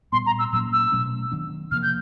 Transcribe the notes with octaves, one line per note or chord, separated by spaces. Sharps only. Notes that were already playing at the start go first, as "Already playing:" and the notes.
A#2 G3 B3 C6
A#5
E6
A#2 F#3 A#3 C#4 E6
E6
B2 F#3 A3 C#4
D#3 F#3 B3 D4
C3 F3 A#3 F6
G6